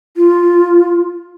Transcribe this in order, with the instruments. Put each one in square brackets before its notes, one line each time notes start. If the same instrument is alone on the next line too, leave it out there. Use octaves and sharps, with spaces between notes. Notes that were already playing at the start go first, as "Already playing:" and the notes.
[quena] F4